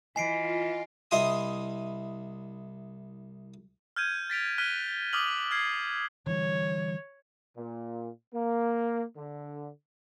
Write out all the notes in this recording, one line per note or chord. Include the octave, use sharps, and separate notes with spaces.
E3 F4 D#5 G#5 C7 D7
C2 E4 D#5 G#5 C6 D#6
F6 G6 G#6 D#7
A6 B6 D7 F7
F6 F#6 B6 D#7 G7
D6 D#6 F6 F#7 G7
F6 G#6 C7
D3 E3 G3 C#5
A#2
A#3
D3